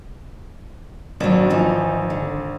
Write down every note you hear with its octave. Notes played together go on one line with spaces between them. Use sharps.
G#1 F#3 D4
E3 F3 D#4
D3